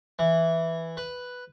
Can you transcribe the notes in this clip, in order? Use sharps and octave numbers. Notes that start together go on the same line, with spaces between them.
E3
B4